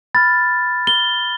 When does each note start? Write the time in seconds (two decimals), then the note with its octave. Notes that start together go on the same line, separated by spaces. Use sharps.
0.14 B5 F6 A6
0.87 G7